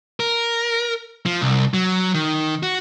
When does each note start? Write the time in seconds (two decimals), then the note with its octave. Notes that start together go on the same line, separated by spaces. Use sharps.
0.20 A#4
1.26 F3
1.41 C2
1.74 F#3
2.14 D#3
2.63 F#4